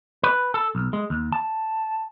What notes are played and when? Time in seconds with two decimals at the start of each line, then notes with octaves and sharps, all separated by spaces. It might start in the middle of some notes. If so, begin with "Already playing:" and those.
0.23 B4
0.54 A4
0.75 B1
0.93 G#3
1.10 D#2
1.32 A5